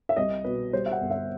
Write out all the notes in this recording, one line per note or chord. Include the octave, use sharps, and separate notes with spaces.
E5
C2 D#5
B2 B4
G3 C5
E5
F#5
G1
E5